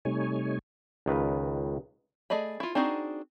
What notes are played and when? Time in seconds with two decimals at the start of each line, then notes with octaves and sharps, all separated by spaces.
0.05 C3 G3 A3 D#4 C#5 G#5
1.06 C#2 D#3 B4
2.30 A3 G#4 D5 D#5 B5
2.60 E4 F4
2.75 C4 D4 D#4 F#4 G#4